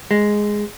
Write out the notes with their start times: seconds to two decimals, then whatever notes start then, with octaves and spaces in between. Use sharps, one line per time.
0.11 G#3